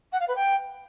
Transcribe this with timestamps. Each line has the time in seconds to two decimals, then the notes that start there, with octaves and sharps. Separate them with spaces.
0.12 F#5
0.20 F5
0.27 B4
0.35 G5